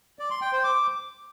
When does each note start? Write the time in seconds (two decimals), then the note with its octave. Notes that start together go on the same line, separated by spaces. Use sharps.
0.19 D5
0.30 C6
0.41 G5
0.53 C5
0.64 D6